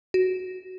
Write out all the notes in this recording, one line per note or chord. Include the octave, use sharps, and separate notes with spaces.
F#4